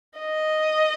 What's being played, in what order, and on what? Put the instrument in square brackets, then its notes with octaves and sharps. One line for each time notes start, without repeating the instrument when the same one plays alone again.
[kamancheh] D#5